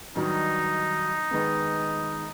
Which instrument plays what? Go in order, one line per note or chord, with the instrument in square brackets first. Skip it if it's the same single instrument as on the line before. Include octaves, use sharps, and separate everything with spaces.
[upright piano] G2 D#3 F#3 [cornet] D#4
[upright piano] D#3 G#3 B3